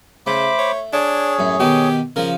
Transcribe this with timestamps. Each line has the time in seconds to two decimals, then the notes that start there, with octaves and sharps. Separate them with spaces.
0.27 C#3 A3 C5 B5 D6
0.59 C#5
0.93 D4 G#4 C#5
1.39 F#2 A2
1.60 B2 D#3 G4
2.16 C#3 F3 A#4